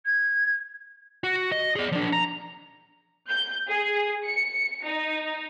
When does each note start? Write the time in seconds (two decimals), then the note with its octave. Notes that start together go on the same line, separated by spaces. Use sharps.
0.06 G#6
1.24 F#4
1.52 D#5
1.76 G#4 D5
1.92 F3 D4
2.13 A#5
3.30 G6
3.69 G#4
4.24 C#7
4.85 D#4